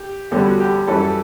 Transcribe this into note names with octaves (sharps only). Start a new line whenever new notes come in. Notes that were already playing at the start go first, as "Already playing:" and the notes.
Already playing: G4
E2 D3 G3 C#4 G4
F#4
G4
F#2 E3 G3 C#4 A4
A4